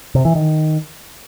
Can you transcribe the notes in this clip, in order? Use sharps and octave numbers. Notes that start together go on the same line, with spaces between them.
C3
E3
D#3